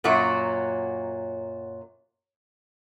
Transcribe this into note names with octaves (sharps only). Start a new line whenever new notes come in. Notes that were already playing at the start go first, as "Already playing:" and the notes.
F#2 A#2 F#3 F#4